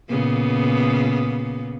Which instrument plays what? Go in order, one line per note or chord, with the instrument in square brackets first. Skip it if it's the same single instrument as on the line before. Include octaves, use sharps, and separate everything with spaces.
[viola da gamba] A#2 C#3 B3